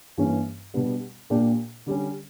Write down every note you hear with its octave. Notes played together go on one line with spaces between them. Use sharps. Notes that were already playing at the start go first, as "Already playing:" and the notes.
G2 E3 A#3 C#4
B2 G3 B3 D4
A#2 A#3 D4 G4
D3 G3 C#4